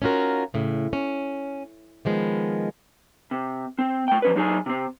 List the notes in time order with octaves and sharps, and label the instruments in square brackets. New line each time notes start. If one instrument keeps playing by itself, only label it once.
[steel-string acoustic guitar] C#4 D#4 F4 F#4 A#4
A2 C#3
C#4
D#3 F3 G#3 B3
[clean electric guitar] C3
C4
A3 G5
F3 C#4 B4
F#3 D#4 G4 G#4 G#5
C3 C4